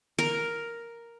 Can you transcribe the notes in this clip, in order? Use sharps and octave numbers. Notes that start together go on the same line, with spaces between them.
A#4